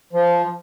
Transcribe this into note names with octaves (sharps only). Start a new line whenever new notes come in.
F3